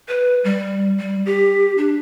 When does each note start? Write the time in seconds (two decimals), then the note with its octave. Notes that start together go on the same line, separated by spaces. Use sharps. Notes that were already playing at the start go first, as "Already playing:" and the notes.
0.08 B4
0.44 G3
0.99 G3
1.26 G4
1.78 D4